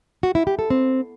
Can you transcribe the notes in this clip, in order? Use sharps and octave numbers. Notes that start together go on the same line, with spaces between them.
F#4
E4
G4
A4
C4